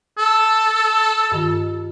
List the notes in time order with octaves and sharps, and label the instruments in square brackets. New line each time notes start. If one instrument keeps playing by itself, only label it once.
[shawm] A4
[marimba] G2 D#3 F4